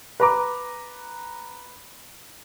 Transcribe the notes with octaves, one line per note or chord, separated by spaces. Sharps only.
B4 A#5 D6